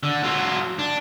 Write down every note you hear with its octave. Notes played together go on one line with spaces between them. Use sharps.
D3
F#3 F4
D4